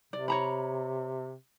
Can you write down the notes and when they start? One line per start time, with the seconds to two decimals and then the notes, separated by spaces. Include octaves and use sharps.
0.13 C3 D5
0.28 C#5 A#5 B5